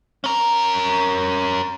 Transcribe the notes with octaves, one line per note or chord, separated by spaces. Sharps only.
C#4 A#4